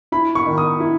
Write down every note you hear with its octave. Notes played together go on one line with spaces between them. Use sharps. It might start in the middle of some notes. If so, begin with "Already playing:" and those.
E4 B5
C#6
D#3
D#6
E4